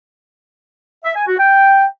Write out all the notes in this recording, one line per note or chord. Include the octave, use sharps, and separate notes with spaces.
E5
G#5
F#4
G5